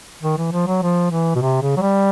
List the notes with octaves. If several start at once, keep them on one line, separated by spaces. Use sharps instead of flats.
D#3
E3
F3
F#3
F3
E3
B2
C3
C#3
F#3
G3